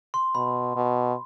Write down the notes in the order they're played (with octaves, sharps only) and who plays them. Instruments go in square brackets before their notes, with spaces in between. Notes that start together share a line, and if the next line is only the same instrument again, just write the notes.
[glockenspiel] C6
[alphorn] B2 [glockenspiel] B5
[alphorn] B2